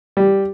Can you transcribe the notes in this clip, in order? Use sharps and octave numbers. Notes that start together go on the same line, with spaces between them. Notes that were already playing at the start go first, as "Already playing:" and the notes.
G3